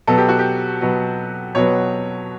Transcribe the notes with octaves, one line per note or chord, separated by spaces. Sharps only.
B2 F#3 B3 A4
G4
F#4
G4
B2 F#3 B3
B2 F#3 B3 C#5